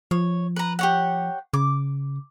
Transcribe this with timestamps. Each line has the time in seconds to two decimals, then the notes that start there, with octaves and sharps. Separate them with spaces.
0.11 F3 C#5
0.56 B4 A#5
0.79 G4 C#5 F#5
1.54 C#3 D6